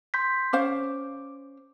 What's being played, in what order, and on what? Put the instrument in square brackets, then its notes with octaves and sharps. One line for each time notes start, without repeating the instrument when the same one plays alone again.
[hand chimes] C6 G6 B6
[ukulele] C#4 C5 F5 [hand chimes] D6